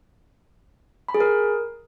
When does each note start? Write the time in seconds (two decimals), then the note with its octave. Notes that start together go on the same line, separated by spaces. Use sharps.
1.08 B5
1.14 G#4
1.20 A#4